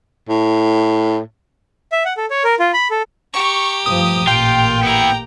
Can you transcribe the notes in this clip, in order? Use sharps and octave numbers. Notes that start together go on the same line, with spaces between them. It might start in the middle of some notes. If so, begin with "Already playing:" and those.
A2
E5
F#5
A4
C#5
A#4
F4
B5
A4
G4 A#5 C#6
G2 F3 A3 D#6
A1 A#2 A#3 F4 G5
B3 E4 G4 A#5